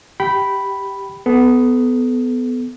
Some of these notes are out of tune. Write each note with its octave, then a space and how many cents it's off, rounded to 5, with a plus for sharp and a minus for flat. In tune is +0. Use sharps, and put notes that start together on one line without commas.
G4 +0 G5 -20 B5 +0
B3 +15 A4 -25